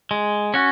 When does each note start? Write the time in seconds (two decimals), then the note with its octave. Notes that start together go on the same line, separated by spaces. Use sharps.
0.11 G#3
0.54 C#4 F#4